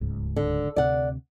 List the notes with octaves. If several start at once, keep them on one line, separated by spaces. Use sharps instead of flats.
D1 C#2 G#2
D3
D2 C3 D5 F#5